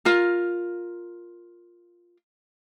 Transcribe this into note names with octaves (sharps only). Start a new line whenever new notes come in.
F4 A#4